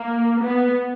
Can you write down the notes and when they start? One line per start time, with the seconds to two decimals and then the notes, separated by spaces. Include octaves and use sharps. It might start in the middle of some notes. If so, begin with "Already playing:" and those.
Already playing: A#3
0.41 B3